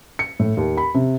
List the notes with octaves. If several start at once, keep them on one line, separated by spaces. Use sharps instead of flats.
C#7
A2
D#2
B5
C3